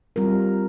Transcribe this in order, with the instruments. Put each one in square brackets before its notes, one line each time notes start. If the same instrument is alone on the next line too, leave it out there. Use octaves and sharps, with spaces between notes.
[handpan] G3 C4 F4 A#4